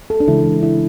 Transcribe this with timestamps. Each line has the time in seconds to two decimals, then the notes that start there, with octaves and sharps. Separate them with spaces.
0.10 A4
0.20 D4
0.27 C#3 E3 G#3 E4
0.62 E4